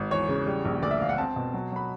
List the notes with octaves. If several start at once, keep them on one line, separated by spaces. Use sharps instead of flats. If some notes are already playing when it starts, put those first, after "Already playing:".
Already playing: G#1
E2 C#5
C#3
G3
A#1
D2 D5
E5
E1 F5
F#5
C4 A5
B2
F#3
F#3 B5